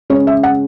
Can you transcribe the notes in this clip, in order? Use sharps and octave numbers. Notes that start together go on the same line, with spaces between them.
C#3 G#3 C#4 C#5
E5
F#5